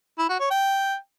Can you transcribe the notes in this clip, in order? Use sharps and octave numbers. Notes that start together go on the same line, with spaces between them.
E4
F#4
C#5
G5